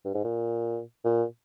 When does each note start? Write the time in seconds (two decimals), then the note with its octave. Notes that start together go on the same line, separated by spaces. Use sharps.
0.05 G2
0.15 G#2
0.24 A#2
1.05 A#2